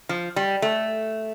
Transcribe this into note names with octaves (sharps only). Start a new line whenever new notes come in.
F3
G3
A3